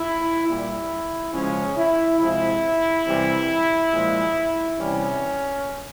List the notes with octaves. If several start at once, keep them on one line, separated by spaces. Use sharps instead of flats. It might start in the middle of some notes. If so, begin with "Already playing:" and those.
Already playing: E4
A#2 G3 E4
C#3 F3 G#3 C#4
E4
C3 F3 G#3 E4
C3 E3 G3
A#2 F3 G#3
C3 E3 G3 C#4